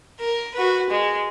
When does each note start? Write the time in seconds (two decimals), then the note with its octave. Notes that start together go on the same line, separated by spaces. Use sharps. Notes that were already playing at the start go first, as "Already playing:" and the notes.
0.20 A#4
0.55 F#4 B4
0.91 G#3